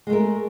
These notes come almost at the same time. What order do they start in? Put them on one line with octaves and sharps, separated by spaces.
G#3 A3 A#4